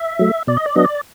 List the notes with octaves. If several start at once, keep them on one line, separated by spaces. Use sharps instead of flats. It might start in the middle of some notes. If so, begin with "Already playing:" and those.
Already playing: E5
F#3 A3
B2 D5
D#5
D5
F#3 B3 D4 D#5
D5